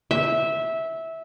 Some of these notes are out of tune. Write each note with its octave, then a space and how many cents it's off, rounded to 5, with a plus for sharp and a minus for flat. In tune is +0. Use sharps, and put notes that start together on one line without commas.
E5 -15